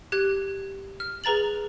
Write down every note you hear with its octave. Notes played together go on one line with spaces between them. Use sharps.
G4 F#6 G#6
F6
G#4 B4 A#5 A6 F#7